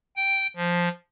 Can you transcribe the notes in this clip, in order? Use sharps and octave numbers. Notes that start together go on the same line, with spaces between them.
G5
F3